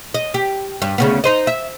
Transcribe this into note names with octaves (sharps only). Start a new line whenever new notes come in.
D#5
G4
G2
D2 C#3 B3
D#4 C5 D#5
E5